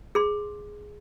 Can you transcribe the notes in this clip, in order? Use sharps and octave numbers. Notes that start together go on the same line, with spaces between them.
G#4 C6